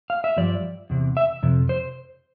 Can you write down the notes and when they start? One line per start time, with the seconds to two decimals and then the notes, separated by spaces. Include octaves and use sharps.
0.10 F5
0.24 E5
0.37 G2 F3 D5
0.90 E2 C3
1.17 E5
1.43 F2 C3
1.69 C5